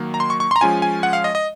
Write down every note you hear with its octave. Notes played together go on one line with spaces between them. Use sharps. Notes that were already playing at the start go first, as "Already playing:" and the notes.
Already playing: D#3 F#3 A#3
A#5
C6
C#6
C#6
A#5 C6
F3 G#3 C#4 F4 G#5
G#5
F#5
F5
D#5
D#5